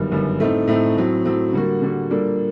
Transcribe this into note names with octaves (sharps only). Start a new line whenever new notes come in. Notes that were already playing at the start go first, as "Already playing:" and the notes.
Already playing: G1 F#2 D#3 G3
G1 F#2 D#3 G3
A2 A3 C4 D#4
A2 A3 C4 D#4
A2 F#3 C4
A2 F#3 C4
D3 G3 A#3 F#4
D3 G3 A#3 F#4
A#2 G3 A#3 D4 A4